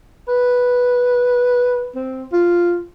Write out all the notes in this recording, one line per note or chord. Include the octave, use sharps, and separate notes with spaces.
B4
C4
F4